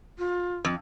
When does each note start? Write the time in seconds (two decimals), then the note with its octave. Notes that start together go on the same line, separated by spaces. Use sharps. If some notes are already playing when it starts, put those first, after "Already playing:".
0.19 F4
0.65 F2